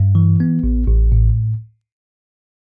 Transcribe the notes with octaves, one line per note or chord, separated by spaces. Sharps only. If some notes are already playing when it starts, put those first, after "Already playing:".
Already playing: G2
E3
B3
A1
A1
A2